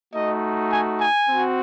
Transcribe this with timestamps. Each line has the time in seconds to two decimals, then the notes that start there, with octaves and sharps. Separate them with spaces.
0.13 A3 D#4 F#4 D#5
0.71 G#5
1.00 G#5
1.29 C4 F#4